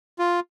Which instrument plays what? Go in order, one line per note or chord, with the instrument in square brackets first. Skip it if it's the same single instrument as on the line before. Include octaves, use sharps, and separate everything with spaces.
[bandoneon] F4